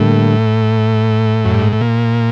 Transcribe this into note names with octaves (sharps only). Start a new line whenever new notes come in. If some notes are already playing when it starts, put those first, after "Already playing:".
Already playing: A2 D3 G3 A#3
F#2
G2
G#2
A2
A#2